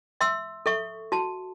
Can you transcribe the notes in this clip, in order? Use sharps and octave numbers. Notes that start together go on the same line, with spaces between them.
E5 C6 E6
A4 E5 C#6
F#4 A5